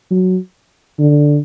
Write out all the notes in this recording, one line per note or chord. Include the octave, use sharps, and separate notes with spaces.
F#3
D3